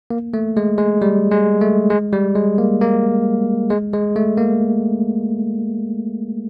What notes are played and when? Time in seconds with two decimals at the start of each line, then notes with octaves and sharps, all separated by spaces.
0.10 A#3
0.34 A3
0.57 G#3
0.78 G#3
1.02 G3
1.32 G#3
1.61 A3
1.90 G#3
2.13 G3
2.35 G#3
2.58 A#3
2.81 A#3
3.70 G#3
3.94 G#3
4.16 A3
4.38 A#3